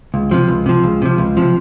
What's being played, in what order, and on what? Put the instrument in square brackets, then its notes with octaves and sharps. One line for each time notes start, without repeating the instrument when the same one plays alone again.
[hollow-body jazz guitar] C#2
C3 F3
C#2
C3 F3
C#2
C3 F3
C#2
C3 F3